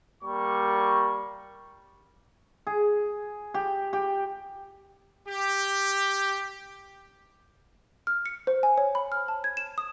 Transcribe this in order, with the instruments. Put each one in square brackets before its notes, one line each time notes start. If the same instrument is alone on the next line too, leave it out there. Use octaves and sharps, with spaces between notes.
[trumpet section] G3 A#3 C#6
[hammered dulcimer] G#4
G4
G4
[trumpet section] G4
[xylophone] F6
C#7
C5
G#5
C#5
B5
F6
A5
G#6
E7
D#6